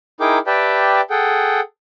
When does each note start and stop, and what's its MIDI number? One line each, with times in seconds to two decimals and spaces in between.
0.20 0.38 63
0.20 0.38 64
0.20 0.38 68
0.20 0.38 70
0.20 0.38 79
0.20 0.38 86
0.47 1.01 67
0.47 1.01 71
0.47 1.01 74
0.47 1.01 76
0.47 1.01 79
0.47 1.01 81
1.10 1.61 68
1.10 1.61 69
1.10 1.61 78
1.10 1.61 79